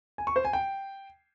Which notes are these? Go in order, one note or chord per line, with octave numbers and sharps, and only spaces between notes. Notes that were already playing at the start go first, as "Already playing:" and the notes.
G#5
C#6
C5
G#5
G5